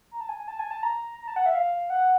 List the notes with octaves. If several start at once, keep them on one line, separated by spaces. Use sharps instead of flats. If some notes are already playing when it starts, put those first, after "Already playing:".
A#5
A5
G#5
G#5
A5
G#5
A5
A#5
A#5
A5
F#5
E5
F5
F#5